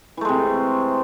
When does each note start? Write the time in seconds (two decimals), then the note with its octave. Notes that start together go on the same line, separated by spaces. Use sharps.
0.17 E3
0.21 A3
0.25 G#3
0.29 C3